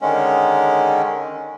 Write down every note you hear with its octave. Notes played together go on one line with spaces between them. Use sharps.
D3 D#3 G#3 C#4